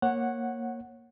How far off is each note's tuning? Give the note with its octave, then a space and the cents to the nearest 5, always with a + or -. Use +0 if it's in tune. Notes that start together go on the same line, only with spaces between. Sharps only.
A#3 +0 C#5 -20 F#5 +0